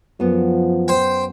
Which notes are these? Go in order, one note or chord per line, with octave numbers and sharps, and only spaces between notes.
F#2 F3 B3
C5 G5